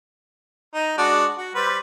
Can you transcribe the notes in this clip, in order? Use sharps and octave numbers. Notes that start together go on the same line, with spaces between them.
D#4
G#3 D4 F#4
F#4
G3 B4 C5